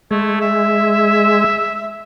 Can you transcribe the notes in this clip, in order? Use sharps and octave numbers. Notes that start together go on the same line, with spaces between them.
G#3 A3
E5